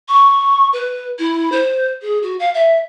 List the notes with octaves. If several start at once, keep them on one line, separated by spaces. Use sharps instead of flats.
C#6
B4
E4
C5
G#4
F#4
F5
E5